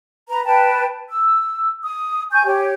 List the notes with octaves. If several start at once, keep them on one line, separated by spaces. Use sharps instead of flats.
B4 A#5
B4 G5 A5
E6
D#6
G#5 C#6 G6
G4 C#5